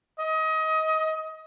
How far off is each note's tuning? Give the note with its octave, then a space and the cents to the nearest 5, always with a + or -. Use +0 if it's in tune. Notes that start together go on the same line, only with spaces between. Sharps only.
D#5 +25